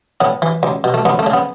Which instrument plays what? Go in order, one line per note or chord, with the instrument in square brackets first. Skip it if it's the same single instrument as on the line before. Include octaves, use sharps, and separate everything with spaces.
[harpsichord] A2 B3
E3
C#2
B2
A3
C#2 B3
A3
C#3
B3